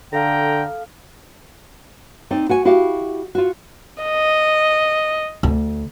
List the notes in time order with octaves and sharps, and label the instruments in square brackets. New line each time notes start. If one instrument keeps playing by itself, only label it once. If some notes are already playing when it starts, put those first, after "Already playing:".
[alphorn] D3 [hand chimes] A4 F5 F6 [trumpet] G5 [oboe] A#5
[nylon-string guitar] C4 D#4 D5
F#4 F#5 G#5
E4 F#4 G4 F5
F4 F#4
[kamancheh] D#5
[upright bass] D2